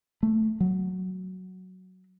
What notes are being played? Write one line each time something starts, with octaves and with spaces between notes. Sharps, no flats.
A3
F#3